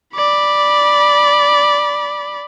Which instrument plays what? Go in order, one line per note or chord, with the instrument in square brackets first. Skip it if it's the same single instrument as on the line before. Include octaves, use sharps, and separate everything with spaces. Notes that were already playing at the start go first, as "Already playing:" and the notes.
[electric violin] D5 B5